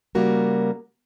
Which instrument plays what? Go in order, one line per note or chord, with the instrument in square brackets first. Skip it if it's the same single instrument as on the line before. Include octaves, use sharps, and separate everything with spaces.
[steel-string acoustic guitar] C#3 G3 A#3 F#4 A#4